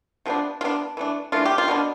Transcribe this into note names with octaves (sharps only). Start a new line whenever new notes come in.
C3 F3 B3 D4
C3 F3 B3 D4 F4
E3 A3 D4
E3 A3 D4 F4
G4
F4
B2 B3 D4